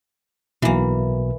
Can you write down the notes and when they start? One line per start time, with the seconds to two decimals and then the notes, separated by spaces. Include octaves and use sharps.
0.62 B1 B2 E3 A#3